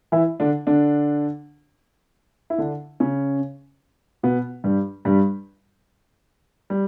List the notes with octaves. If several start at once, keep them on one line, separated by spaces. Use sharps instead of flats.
E3 E4
D3 D4
D3 D4
E4
D3 D4
C#3 C#4
B2 B3
G2 G3
G2 G3
G3